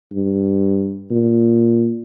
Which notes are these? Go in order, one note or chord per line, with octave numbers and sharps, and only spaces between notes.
G2
A#2